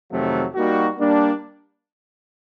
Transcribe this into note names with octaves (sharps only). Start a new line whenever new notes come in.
F2 C3 D#3 F#3 A3
G3 A#3 D#4 F#4
G3 A#3 D4